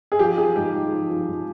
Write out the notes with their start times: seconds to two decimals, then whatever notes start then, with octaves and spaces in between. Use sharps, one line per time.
0.12 G#4
0.19 F3 G4
0.38 F3 G#4
0.56 G#2 G4
0.73 G#2
0.92 F3
1.10 F3
1.28 G#2